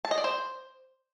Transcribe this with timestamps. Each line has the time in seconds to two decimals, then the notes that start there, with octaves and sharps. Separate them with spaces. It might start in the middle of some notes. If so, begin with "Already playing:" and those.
0.05 A5
0.11 D#5
0.18 D5
0.24 C5